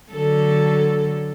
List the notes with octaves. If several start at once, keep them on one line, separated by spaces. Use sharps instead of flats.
D3 F#3 A4